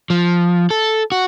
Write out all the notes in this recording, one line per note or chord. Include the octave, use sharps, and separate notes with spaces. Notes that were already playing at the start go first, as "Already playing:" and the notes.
F3
A4
F#4